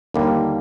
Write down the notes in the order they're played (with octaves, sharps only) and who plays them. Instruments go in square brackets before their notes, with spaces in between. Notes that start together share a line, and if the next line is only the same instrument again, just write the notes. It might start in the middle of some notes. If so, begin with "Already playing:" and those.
[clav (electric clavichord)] D#2 D3 G3 A#3